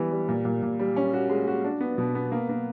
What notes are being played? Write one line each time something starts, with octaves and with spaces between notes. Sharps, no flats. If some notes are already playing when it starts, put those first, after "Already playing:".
Already playing: E3 G3 B3
G3
A#2
A#2
A#2
G3
C#4
F#4
G#3
F#4
D4
B3
B2
B3
A#3
A#3